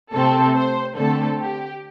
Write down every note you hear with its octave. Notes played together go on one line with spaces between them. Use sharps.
C3 A3 C4 A4
C5
D3 A3 C4 A4
G4